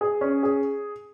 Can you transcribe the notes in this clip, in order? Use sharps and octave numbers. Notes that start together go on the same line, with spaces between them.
G#4
C#4
G#4